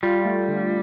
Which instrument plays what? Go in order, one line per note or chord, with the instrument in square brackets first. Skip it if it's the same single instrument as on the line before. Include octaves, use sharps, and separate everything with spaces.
[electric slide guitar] G3 [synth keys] F4
[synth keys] A3
D3